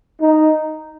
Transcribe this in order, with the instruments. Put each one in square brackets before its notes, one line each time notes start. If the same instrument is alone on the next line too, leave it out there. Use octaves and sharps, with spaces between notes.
[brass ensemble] D#4